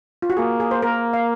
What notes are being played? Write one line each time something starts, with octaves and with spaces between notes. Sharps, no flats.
F4
F#4
A#3 G#4
G#4
C5
A#3 A#4
F5